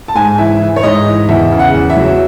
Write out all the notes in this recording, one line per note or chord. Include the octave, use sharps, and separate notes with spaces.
A5
G#2 G#5
E3 E5
E3
C#5
G#2 D#5
E3
E2 E5
C#3
F#5
E2
E5
F#3